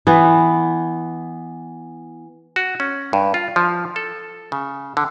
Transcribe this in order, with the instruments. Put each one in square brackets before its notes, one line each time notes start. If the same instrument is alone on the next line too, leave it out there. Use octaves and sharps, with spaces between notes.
[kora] E3 B3
[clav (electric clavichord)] F#4
C#4
G2
F4
F3
A4
C#3
D3